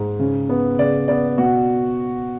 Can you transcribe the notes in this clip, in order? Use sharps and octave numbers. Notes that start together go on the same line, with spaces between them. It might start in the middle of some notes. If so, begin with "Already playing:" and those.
Already playing: G#2
C#3
B3
C#3 D5
B3 D5
B2 F#4